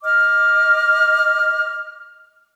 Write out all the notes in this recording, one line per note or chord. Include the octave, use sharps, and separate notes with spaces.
D#5 D6 F6